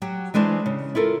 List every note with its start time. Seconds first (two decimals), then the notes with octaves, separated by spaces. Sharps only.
0.02 F#3 F#4 G4
0.34 E3 G#3 D4 C5
0.66 C#3
0.95 E4 F4 A4 A#4